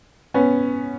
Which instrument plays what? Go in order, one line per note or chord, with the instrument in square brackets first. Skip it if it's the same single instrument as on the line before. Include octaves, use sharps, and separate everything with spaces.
[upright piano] B3 C#4